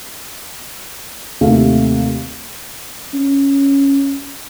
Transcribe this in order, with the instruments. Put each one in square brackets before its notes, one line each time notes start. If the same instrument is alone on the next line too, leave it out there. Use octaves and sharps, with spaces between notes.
[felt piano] D#2 C3 A3 F5
[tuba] C#4